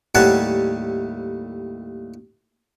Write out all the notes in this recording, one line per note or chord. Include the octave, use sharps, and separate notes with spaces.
D#2 A2 G3 C#5 F#5 A5